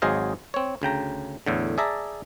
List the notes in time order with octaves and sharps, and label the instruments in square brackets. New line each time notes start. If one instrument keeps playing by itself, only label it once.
[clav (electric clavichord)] G#1 F#3 G#4 C5 D#5 F5
C4 C#5
D2 C#3 G5 A#5
E2 A2 D3
G#4 D5 E5 A5 A#5